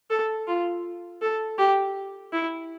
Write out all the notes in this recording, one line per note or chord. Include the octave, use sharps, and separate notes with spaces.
A4
F4
A4
G4
E4